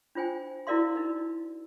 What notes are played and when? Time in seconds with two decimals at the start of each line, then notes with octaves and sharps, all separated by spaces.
0.15 D4 F4 C5 G5 G#5
0.67 E4 F#4 A#4 D5 F5 C6
0.96 D#4 A#4